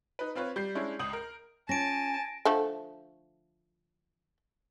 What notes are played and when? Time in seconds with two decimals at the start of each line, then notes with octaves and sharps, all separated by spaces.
0.19 D#4 B4
0.35 C4 F4 B4 C#5
0.56 G3 G6 C7
0.75 G#3 C#4 D4 E4
0.99 C#2 D#6 G6 F#7
1.13 A#4
1.69 C#4 F4 G#5 A5 A#6 D7
2.45 D3 F3 A3